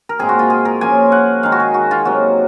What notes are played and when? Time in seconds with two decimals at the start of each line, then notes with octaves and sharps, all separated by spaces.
0.09 A#4
0.19 A#2 G#3 C4 G#4
0.29 F#4
0.39 F4
0.50 G#4
0.65 A#4
0.81 F3 A#3 C#4 G#5
1.12 F#5
1.43 D#3 G#3 D#4 F5
1.52 F#4
1.60 G#4
1.74 F#4
1.91 F4
2.05 C3 F#3 A#3 F#4